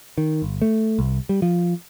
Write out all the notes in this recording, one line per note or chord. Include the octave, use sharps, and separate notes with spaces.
D#3
G1
A3
C2
G3
F3